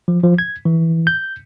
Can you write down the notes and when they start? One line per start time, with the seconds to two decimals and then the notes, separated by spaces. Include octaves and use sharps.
0.08 F3
0.23 F3
0.38 G#6
0.65 E3
1.07 G6